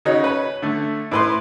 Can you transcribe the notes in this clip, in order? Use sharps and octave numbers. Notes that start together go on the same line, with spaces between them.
C#3 D#4 F#4 C#5
B4 C#5
D3 A3
A2 B4 C6